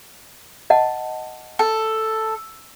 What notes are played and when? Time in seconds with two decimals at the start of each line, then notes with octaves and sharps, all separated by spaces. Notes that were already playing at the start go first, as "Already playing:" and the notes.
0.70 D#5 F#5 A5
1.59 A4